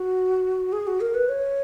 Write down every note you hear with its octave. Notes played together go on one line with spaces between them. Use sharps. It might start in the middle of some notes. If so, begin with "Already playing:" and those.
Already playing: F#4
G#4
F#4
A#4
B4
C#5